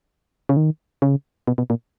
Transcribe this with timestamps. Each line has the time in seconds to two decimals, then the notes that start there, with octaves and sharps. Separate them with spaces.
0.49 C#3
0.57 D#3
1.02 C#3
1.47 B2
1.58 B2
1.70 A#2